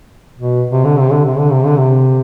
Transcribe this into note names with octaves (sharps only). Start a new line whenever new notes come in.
B2
C3
D3
C3
D3
C3
D3
C3
D3
C3